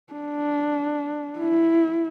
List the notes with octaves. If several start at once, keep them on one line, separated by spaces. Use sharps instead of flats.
D4
E4